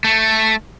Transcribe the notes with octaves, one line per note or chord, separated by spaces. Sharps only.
A3